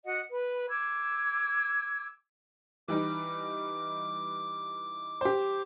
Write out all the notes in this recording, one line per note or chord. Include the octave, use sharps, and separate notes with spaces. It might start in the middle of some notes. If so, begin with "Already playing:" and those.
F#4 D#5 F#5
B4
D6 E6 G#6
E3 G3 D#4 D6
G4 C5